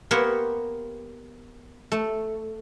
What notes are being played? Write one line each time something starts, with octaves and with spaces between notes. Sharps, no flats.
A#3 B3 G4 C5 C#5
A3